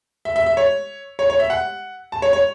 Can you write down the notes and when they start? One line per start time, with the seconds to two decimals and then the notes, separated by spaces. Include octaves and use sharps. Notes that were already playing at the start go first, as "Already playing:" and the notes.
0.25 E5
0.36 E5
0.46 E5
0.57 C#5
1.19 C#5
1.30 C#5
1.40 E5
1.50 F#5
2.12 A5
2.22 C#5
2.33 C#5